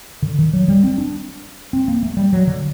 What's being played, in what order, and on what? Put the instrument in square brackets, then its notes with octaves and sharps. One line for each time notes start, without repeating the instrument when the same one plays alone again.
[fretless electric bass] D3
D#3
F#3
G3
C4
D4
C4
A#3
A3
G3
F#3
D3